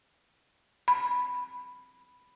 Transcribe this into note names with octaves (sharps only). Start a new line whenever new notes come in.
B5